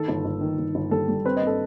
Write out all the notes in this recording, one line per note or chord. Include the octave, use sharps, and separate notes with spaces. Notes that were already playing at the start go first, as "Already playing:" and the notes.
Already playing: D#3 A4
G1
G1
D#3
G1
G1
G3 A4
G3
C4 B4
D#5
C4
A4